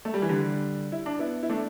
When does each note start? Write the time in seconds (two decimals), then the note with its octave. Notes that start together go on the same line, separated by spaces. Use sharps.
0.05 A3
0.14 G3
0.22 E3
0.29 D3 G3
0.92 E4
1.06 D4
1.19 B3 E4
1.43 E4
1.49 A3 D4